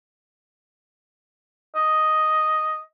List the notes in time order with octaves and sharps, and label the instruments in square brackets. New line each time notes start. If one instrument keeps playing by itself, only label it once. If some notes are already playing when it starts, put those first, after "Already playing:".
[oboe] D#5